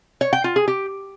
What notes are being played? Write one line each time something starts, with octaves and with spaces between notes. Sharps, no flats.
C#5
G5
F4
G#4
G4